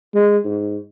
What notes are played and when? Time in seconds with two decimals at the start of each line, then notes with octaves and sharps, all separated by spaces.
0.14 G#3
0.45 G#2